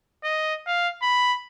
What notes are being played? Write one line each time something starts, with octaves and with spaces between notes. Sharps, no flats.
D#5
F5
B5